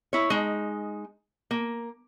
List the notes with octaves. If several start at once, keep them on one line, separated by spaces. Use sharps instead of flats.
E4 C#5
G#3 D#4
A#3